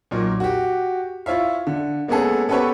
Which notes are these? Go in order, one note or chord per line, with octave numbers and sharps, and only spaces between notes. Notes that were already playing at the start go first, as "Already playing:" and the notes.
B1 A#2 A#4
F#4 G4
E4 F4 C#5 E5 F5
D3
G#3 A#3 B3 C#4 G#4 A4
B3 C#4 G4 A4 B4 C#5